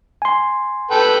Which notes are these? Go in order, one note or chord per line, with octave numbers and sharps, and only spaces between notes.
G#5 C6
A4 B4 G5